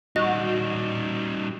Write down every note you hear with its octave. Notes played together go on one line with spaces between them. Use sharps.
G3 D#4 F#4 D#5